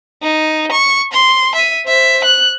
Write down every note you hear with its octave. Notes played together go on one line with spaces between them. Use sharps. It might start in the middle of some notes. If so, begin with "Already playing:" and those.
D#4
C#6
C6
E5 D#7
C5 E5
F#6